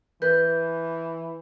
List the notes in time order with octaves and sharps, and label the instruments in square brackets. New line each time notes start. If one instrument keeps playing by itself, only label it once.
[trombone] E3 [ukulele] B4 [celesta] G6